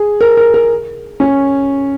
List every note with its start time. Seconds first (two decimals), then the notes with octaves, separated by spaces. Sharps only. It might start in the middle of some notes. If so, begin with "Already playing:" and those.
Already playing: G#4
0.21 A#4
0.37 A#4
0.54 A#4
1.20 C#4